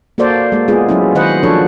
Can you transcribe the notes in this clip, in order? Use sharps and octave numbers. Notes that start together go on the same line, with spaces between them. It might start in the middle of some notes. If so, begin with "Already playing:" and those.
A#3 F#4 A4 C5 D5
G#3 A#3
G#3 B3 F4 G#4
F#3 C#4 E4
D#3 F#4 B4 C5 D#5 F#5
F3 D4 A4 C#5